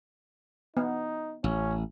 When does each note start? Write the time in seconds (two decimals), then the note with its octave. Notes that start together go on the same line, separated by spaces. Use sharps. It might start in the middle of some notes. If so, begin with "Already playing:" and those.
0.77 B3 D#4
1.44 A1 C#4